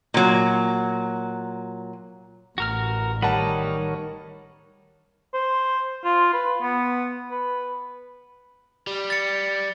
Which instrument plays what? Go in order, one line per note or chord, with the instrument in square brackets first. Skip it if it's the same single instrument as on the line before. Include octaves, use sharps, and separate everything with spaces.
[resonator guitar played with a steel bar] A#2 F#3
[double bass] A1 [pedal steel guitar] F#4 A#4 F6
[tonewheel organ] D#3 A#4 C#5 [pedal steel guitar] G3 D#4 B5 [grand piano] F#5 A5
[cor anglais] C5
F4
B4
B3
B4
[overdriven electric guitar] G3
[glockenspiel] A6 C#7